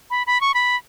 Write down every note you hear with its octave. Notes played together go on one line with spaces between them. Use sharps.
B5
B5
C#6
B5